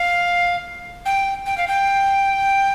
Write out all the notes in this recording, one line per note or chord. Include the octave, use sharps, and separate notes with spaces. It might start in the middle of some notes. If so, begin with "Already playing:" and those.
Already playing: F5
G5
G5
F5
G5